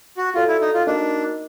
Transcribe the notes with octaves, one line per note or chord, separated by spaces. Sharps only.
F#4
F4 F#4 A4 D5
E4
D#4
F4
A#3 D4 D#4 F#4 A#4 D#5